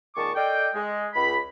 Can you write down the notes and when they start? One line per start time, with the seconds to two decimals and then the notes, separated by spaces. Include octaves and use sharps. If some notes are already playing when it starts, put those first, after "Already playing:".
0.15 A#2 D#3 G#3 A5 C#6 D6
0.35 A4 D5 D#5 F5 G5
0.74 G#3
1.14 C#2 B5